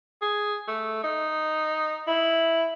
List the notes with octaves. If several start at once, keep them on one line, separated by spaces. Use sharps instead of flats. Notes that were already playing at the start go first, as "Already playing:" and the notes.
G#4
A3
D#4
E4